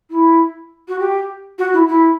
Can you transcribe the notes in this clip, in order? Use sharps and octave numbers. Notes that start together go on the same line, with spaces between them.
E4
F#4
G4
F#4
E4
E4